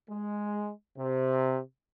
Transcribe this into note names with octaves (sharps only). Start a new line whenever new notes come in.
G#3
C3